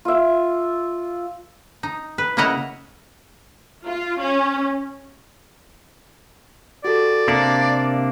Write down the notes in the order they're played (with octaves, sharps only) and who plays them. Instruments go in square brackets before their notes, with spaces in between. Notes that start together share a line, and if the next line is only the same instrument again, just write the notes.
[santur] F4 E5
[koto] D#4
B4
C#3 A#3 E4 D#5 F#5 A#5
[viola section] F4
C#4
[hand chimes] F#4 G4 A4 [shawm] D5
[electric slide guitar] C3 A#3 D4 [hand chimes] C6 C#7